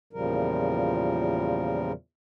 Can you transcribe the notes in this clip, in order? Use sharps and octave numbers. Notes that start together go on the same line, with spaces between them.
E2 A#2 C#3 F3 G3 A#4